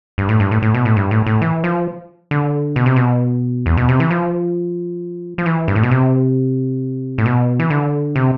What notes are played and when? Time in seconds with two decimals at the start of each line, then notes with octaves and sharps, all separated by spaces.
0.18 G2
0.29 A2
0.40 G2
0.51 A2
0.62 A2
0.74 B2
0.85 A2
0.96 G2
1.11 A2
1.26 A2
1.42 E3
1.64 F3
2.31 D3
2.76 B2
2.86 C3
2.96 B2
3.66 E2
3.77 B2
3.89 C3
4.00 E3
4.11 F3
5.38 F3
5.46 E3
5.68 G2
5.75 A2
5.83 B2
5.91 C3
7.18 A2
7.26 B2
7.60 E3
7.70 D3
8.16 C3